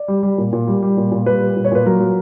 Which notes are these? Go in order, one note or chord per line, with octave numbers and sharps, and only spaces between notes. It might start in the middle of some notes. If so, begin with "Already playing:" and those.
Already playing: D5
G3
G3
A#2
A#2
G3
G3
A#2
A#2
G3 B4
G3
A#2
C#5
A#2 B4
F#3 A#4
F#3